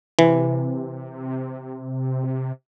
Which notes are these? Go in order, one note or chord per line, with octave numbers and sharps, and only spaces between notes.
C3 E3